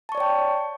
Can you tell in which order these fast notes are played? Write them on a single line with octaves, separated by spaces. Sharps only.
A5 C#6 D5 C#5 G5